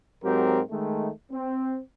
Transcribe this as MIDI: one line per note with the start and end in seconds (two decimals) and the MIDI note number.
0.24 0.61 44
0.24 0.61 54
0.24 0.61 60
0.24 0.61 67
0.24 0.61 70
0.71 1.10 51
0.71 1.10 56
0.71 1.10 57
1.32 1.80 60